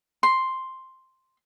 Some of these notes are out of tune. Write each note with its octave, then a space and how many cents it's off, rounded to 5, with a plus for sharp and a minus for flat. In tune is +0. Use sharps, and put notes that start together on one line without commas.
C6 +0